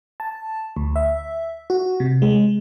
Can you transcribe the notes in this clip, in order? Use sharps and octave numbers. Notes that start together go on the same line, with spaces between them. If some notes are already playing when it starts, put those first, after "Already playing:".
A5
D2
E5
F#4
C3
G#3